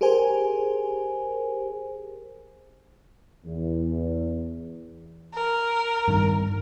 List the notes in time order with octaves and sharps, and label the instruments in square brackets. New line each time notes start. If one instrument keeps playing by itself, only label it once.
[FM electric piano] G4 G#4 A#4 C5 G#5
[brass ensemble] E2
[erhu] A#4
[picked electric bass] G2 D#3